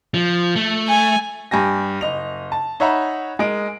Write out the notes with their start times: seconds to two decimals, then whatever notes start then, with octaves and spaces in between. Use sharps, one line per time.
0.14 F3
0.56 A3
0.88 G#5
1.51 G2 G4 G#5 A#6
2.01 F#1 D#5 F7
2.52 A5
2.80 D#4 C#5 E5 F#5 A#5 B5
3.39 G#3 A#4 D#5 D7